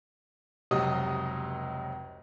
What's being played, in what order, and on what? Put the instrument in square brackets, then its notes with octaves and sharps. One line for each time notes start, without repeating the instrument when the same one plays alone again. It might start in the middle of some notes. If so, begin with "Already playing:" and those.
[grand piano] F1 C#2 C3 F#3 D#5 D#6